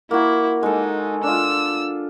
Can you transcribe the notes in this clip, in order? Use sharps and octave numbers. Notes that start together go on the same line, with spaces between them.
A#3 E4 F#4
G#3 D#4 A4
D4 F4 E6